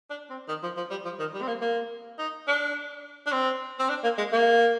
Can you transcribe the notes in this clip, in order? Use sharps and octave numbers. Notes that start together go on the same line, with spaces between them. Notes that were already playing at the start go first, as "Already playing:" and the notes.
D4
C4
D#3
F3
F3
G3
F3
D#3
G3
C4
A#3
A#3
D#4
D4
D4
C4
C4
D4
A#3
G#3
A#3